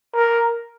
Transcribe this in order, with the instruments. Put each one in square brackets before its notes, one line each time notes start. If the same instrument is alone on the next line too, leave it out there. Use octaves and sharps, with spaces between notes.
[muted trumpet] A#4